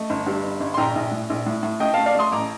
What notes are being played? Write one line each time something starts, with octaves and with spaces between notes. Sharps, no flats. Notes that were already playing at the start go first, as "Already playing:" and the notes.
Already playing: A3 D#5
G1
G2
G1
G1
C6
A#1 G5 A#5
A#1
A2
A#1
A2
A2
A3 D#5 G5
F5 A5
A3
D5 F5
A3 C6 D#6
A1 A#5 D6